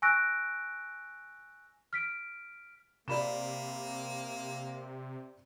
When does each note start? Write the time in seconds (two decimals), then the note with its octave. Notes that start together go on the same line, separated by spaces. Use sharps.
0.02 G#5 C#6 E6 F#6 A#6 D7
1.93 F6 B6 D7
3.08 C3 A#3 D5 B5 E7